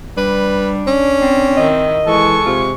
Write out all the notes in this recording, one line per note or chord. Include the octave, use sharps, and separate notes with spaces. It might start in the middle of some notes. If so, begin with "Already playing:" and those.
G3 D4 B4
C#4
C4
D#3 E4 D#5
E3 G#3 A4 C#6
C3 F4